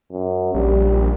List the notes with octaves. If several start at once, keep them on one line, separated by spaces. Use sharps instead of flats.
F#2
A#1 G3